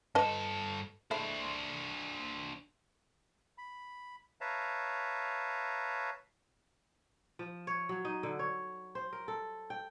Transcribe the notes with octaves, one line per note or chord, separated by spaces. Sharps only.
G2 A4 B4 D#5 A5
G#3 A3 D4 E4 C5
B5
B4 C#5 E5 F5 A5 A#5
F3
C#5
F#3
D#4
D3
C#5
C5
A#4
A4
G5